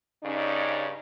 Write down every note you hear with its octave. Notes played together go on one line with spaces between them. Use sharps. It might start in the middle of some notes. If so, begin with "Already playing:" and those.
G2 C#3 C#4 D#4 C#5 D5